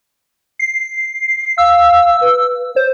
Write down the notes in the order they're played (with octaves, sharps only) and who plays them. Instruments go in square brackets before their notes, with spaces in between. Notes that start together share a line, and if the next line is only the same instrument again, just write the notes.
[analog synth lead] C7
[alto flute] F5 [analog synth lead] E6
[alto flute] B4
[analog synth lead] C5 [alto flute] C#5